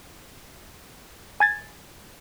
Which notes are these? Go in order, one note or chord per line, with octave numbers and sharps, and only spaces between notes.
G#5 G#6 A6